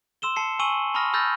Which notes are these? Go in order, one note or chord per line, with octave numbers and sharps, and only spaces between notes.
C6 E6 E7 G7
A5 C7 C#7
G#5 C#6 E6 D#7 F#7 G7
A5 B5 C#6 D#6 F6 A#6
B5 E6 F6 G6 A6 A#6